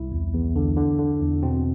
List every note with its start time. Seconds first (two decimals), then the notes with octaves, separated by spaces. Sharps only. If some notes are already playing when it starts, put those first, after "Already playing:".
Already playing: C2 E4
0.12 E2
0.33 E2
0.56 D3
0.77 D3
0.98 D3
1.21 E2
1.42 B2 C4